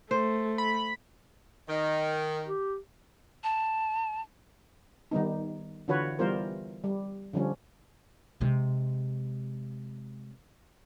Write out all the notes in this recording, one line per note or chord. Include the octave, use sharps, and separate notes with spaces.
A3 C5
B5
D#3 D#5
G4
A5
D#3 G3 B3 D#4
D3 E3 F4 F#4 B4 C#5
E3 G3 B3 F4 A#4 C5
G3
D3 F3 G3 C#4
C3 G#3